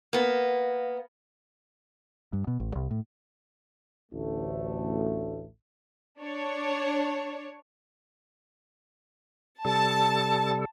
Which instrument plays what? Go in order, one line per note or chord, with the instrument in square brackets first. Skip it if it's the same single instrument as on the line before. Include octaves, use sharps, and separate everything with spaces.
[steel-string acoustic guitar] A#3 B3
[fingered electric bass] G2
B2
A1
C2
A2
[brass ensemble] A1 D2 A3
[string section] D4 C#5
[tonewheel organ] C3 G3 A4 [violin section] A5